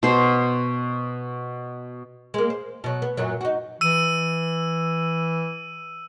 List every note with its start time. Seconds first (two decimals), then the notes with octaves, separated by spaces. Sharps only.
0.03 B2 C5
2.34 G#3 A#3
2.50 C5
2.84 B2 F#3
3.02 B3
3.17 F#2 A#2 F#3
3.41 D#4 F#4
3.81 E3 E6 D#7